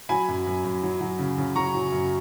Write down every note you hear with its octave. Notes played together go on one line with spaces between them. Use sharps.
F#3 G#5 B5
F#2
F#2
F#2
F#3
F#3
C#3
C#3
F#3 A#5 C#6
F#3
F#2